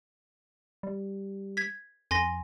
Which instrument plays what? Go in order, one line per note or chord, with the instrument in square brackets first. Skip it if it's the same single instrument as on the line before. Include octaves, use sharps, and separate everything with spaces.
[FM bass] G3
[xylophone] G#6 B6
[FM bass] F2 [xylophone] G#5 C6 A#6